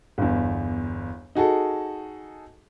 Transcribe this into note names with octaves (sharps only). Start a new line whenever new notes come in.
G1 E2
D#4 F#4 G#4 A4